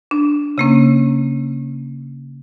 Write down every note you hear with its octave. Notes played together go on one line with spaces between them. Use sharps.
D4
C#3 A#3 C#4